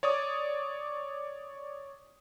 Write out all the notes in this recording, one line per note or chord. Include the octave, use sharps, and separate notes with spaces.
C#5 D5 D6 D#6